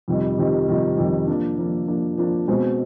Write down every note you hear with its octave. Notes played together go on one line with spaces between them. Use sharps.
F2 C3 D#3 G3
F2 C3 D#3 G3
F2 C3 D#3 G3
F2 C3 D#3 G3
F3 A#3 D4
F3 A#3 D4
F3 A#3 D4
F3 A#3 D4
B2 G#3 C4